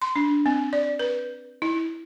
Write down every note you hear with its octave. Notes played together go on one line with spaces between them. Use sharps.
C6
D4
C4
D5
B4
E4